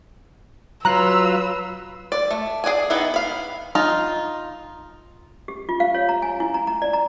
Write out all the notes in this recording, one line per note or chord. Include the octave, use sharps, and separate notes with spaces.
F#3 F4 B4 A#5 E6 F#6
D5
A3
G#4 D5 F#5 G#5
D#3 B3 E4
F5 B5
D#4 F4
G4
F4
F5
C#5
A#5
G#5
E4
A#5
A#5
D5
A#5